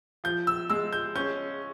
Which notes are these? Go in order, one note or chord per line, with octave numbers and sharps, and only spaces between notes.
F3 G6
E6
G#3 E6
G6
C#4 G6